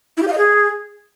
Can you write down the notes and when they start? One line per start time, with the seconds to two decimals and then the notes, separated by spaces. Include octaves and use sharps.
0.17 E4
0.22 G4
0.28 F5
0.33 D#5
0.38 G#4